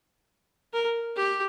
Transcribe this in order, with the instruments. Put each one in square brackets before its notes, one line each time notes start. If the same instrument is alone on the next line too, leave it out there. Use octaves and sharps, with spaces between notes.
[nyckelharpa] A#4
G4